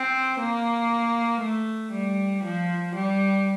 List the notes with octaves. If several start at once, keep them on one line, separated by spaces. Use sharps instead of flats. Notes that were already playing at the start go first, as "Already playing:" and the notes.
Already playing: C4
A#3
A3
G3
F3
G3